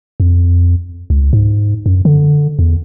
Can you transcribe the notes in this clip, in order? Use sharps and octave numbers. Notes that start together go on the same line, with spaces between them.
F2
C#2
G#2
F#2
D3
E2